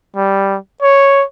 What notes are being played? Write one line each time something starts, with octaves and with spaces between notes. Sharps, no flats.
G3
C#5